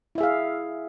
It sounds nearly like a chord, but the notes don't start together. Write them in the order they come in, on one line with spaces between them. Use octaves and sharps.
E4 E5 G#4 F5